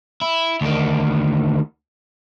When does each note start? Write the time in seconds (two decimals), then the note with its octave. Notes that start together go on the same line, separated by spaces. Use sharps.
0.21 E4
0.61 D2 D#3